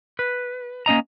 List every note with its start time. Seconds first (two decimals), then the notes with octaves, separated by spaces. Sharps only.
0.19 B4
0.86 A#3 C#4 D#5 A#5